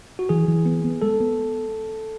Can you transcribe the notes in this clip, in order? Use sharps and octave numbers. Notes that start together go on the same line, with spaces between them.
F#4
E3 G#4
E3
B3
B3
G#3 A4
B3